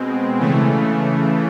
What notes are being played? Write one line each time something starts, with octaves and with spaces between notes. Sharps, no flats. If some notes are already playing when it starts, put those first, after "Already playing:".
Already playing: B2 G#3 C4
C#3 E3 A3